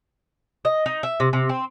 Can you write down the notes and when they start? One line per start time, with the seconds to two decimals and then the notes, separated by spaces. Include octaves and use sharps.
0.65 D#5
0.86 D#4
1.03 E5
1.20 C3
1.33 C3
1.49 C4